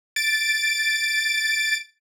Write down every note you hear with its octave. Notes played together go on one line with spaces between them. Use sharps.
A6 D7